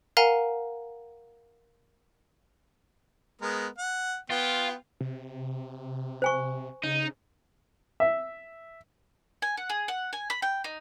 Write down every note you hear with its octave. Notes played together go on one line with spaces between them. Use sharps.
A#4 F5 F#5 G#5 A#5
G#3 B3 A#4
F#5
B3 F4 G5
C3
C5 G#5 C#6
C#3 D#4
E5
G#5
F#5
G#4
F#5
G#5
B5
G5
D#4